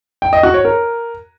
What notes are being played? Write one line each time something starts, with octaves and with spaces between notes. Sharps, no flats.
G5
D#5
F#4
C#5
A#4